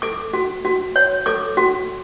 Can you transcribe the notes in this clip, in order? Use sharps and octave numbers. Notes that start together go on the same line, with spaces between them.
A4 D6
F#4
F#4
C#5
A4 D6
F#4